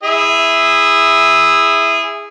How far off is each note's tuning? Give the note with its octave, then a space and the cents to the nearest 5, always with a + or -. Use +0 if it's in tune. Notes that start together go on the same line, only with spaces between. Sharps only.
E4 +0 G#4 -15 E5 +0